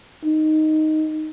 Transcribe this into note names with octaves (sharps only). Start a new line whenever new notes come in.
D#4